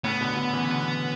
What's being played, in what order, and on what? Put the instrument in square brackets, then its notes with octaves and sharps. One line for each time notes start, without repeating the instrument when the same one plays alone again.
[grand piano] A2 C#3 [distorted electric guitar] B3
[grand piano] B2 D3
B2 D3
C#3 E3
B2 D3